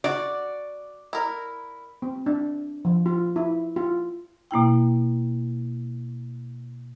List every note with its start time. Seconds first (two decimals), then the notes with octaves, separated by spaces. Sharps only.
0.04 F#4 D5
1.13 E4 A#4
2.02 C4
2.26 D4
2.85 F3
3.06 F4
3.36 E4
3.76 F4
4.51 B2 A#3 E4 G5